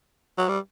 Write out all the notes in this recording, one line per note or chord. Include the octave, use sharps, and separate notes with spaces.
F#3
G3